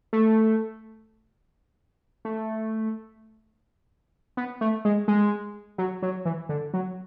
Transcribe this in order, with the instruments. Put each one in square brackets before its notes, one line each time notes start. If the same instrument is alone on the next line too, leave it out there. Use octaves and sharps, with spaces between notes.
[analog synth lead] A3
A3
B3
A3
G#3
G#3
F#3
F#3
E3
D3
F#3